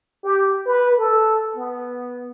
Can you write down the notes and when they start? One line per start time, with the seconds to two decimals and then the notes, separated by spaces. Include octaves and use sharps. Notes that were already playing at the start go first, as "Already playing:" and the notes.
0.24 G4
0.66 B4
0.98 A4
1.56 B3